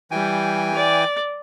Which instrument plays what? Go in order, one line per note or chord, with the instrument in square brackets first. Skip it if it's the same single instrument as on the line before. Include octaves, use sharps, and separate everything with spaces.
[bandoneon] E3 G5 G#5 [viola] G3
[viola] D5